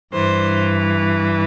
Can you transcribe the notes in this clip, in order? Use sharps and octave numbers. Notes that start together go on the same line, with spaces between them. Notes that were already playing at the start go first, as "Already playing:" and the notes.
G2 E3 C5